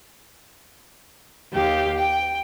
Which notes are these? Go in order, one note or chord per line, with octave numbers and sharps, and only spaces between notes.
D#2 G4 F5 G5
G5